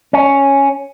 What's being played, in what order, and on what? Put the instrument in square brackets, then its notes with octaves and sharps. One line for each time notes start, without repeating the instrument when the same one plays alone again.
[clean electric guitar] C#4